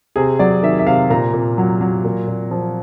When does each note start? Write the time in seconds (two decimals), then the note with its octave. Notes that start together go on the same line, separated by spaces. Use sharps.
0.16 C3 G#4
0.39 F#3 D5
0.63 D#3 E5
0.79 E5
0.87 C3 F5
1.10 A#2 A#5
1.34 A#2
1.58 F#3
1.81 F#3
2.04 A#2
2.27 A#2
2.51 F3